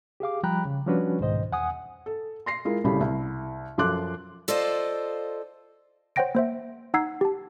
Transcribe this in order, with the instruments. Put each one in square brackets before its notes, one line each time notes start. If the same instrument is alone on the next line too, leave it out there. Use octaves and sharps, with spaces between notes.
[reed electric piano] G4 G#4 F5 D6
F3 G3 G5 A#5 B5 F#6
C#3
F3 G3 C#4 D4 F#4 B4
C2 G#2 B2 D#3 C5 D#5
E2 F#5 G#5 D#6
[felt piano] A4
C6 A#6 C7
G#3 E4 F4 A#4
C2 A2 C#3 G3 A3 B5
C2
F#2 F3 A4 C6 D6 F#6
[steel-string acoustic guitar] F4 A4 C5 D5 D#5 F5
[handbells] C5 C#5 F#5 G5 A#6 D7
A#3 C5 E5
D#4 F#5 A#5 E6 G#6 C7
G4 A5